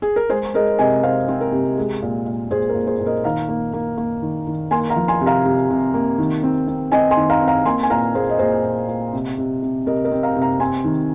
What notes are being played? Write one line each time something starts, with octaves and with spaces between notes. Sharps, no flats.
G#4
A#4
G#3 G#4 C5
G#3 A#4 D#5
C3 D#5 G#5
C3 C5 F5
C4
A#4
C3
G#3
A#2
A#2
A#2 G#4 C5
A#4
A#2
G#4 C5
A#2
A#4 D#5
D#3 F5 A#5
A#3
A#3
A#3
D#3
D#3
A#3 G#5 C6
F5 A#5
F3
G#5 C6
C3
F5 A#5
C3
C3
A#3
D#3
C4
C4
C4 D#5 G#5
G#5 C6
D#3
F5 A#5
C4
F5 A#5
A#3 G#5 C6
G#5
A#2 F5 A#5
A#3 G#4 C5
D#5
A#2 G#4 C5
A#2
A#2
C3
C3
C3
C3 A#4 D#5
A#4 D#5
C4
F5 A#5
C3
F5 A#5
C4 G#5 C6
D#3